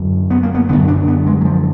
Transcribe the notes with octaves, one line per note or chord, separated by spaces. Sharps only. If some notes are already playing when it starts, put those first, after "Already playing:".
Already playing: F#2 D3
B3
A#3
B3
F#2 D3 B3
D4
B3
G#3
F#3
F3